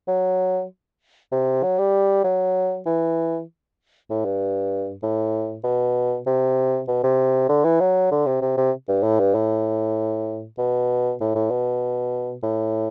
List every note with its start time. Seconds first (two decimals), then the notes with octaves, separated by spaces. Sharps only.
0.08 F#3
1.32 C3
1.63 F#3
1.79 G3
2.24 F#3
2.86 E3
4.10 A2
4.25 G2
5.03 A2
5.64 B2
6.27 C3
6.88 B2
7.04 C3
7.49 D3
7.65 E3
7.80 F#3
8.11 D3
8.27 C3
8.42 C3
8.58 C3
8.88 G2
9.03 A2
9.20 G2
9.35 A2
10.58 B2
11.21 A2
11.35 A2
11.51 B2
12.43 A2